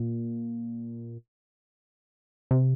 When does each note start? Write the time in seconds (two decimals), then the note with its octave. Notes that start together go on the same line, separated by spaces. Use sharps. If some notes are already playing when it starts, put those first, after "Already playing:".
Already playing: A#2
2.51 C3